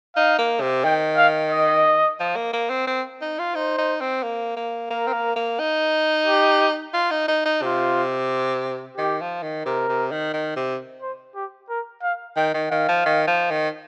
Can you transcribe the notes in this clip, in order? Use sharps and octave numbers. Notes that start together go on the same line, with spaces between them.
D#4 F5
A#3
C3
D#3 G5
F5
D#5
F3
A#3
A#3
C4
C4
D#4
F4
D#4 C5
D#4
C4
A#3
A#3
A#3 A#4
C4
A#3
A#3
D#4
G4
F4
D#4
D#4
D#4
C3 F4
D#3 G4
F3
D#3
C3 A#4
C3
D#3
D#3
C3
C5
G4
A#4
F5
D#3 G5
D#3
D#3 F5
F3
D#3
F3
D#3